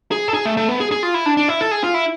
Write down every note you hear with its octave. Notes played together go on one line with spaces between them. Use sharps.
G#4
A4
G#4
A3
A3
B3
G#4
G#4
F4
E4
D4
D4
E4
A4
G#4
F4
E4